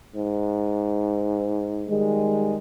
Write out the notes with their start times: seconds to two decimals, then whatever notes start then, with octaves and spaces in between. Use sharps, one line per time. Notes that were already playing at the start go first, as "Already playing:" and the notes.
0.15 G#2
1.89 D#3 G3 G#3